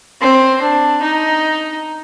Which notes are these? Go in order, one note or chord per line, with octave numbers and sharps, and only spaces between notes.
C4
D4
D#4